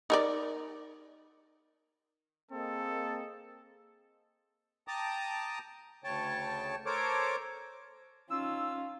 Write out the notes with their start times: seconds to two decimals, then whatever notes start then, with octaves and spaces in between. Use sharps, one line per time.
0.10 D#4 A#4 D5
2.51 A#3 C4 G#4 A4 D#5
4.88 G5 A5 A#5 D6 D#6
6.04 D2 C#3 C#5 G5 A5
6.86 A4 A#4 C5 C#5 D6
8.30 C#4 D#4 F4 E6